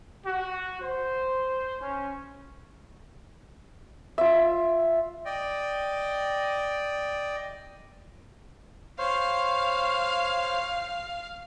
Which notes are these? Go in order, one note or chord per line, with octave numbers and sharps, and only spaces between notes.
F#4
C5
C#4
F4 E5
D5 D#5 G5
C5 C#5 F5